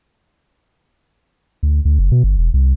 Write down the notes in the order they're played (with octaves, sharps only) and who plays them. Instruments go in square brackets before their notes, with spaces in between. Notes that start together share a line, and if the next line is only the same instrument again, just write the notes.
[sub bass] D2
D2
F#1
B2
G1
E1
C2